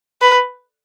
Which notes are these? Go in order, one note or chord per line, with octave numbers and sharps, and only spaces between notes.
B4